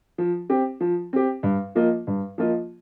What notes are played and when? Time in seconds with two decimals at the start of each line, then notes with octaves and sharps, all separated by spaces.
0.18 F3
0.50 C4 G4
0.81 F3
1.13 C4 G4
1.43 G2
1.75 F3 A#3 F4 D#5
2.07 G2
2.38 F3 A#3 F4 D#5